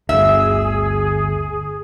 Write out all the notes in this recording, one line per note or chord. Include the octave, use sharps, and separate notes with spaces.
G1 D2 G#4 E5